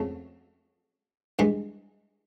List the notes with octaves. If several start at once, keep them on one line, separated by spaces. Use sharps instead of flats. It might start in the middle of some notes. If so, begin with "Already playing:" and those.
Already playing: F2 C#3 F3 A3
G2 E3 G#3